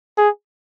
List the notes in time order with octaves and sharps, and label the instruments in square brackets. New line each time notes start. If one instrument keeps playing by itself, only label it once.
[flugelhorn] G#4